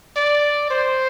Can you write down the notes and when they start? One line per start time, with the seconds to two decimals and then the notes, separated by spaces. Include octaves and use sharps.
0.16 D5
0.71 C5